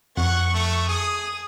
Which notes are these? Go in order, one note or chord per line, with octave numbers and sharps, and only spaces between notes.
F2 F#5 C#6
A3
G#4 D#6